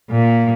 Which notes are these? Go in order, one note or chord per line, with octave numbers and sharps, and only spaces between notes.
A#2